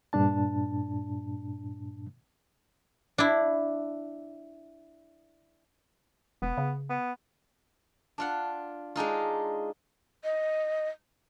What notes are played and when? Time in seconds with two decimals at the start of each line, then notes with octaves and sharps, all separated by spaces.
0.13 G2 A#2 D4 A5
3.18 D4 E4
6.42 E1 B3
6.58 C#3
6.90 B3
8.18 D4 F4 F#5
8.95 G#3 D4 D#4 F4
10.24 D#5